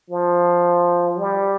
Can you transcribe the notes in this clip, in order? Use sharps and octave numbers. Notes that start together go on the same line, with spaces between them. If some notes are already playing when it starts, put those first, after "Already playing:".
F3
G3